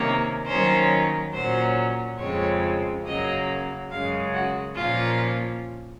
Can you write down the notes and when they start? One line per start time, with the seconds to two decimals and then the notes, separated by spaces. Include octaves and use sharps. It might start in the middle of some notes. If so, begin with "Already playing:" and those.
Already playing: C3 D#3 A#3 C#4
0.46 D#3 F#3 A#3 C#4 C5
1.33 A#2 F#3 C#4 C5
2.18 F2 C#3 F3 G#3 C4 C#5
3.04 F#2 C#3 F#3 A#3 D#5
3.90 F#2 C#3 G#3 F5
4.34 F#4
4.76 A#2 F3 A#3 C#4 F4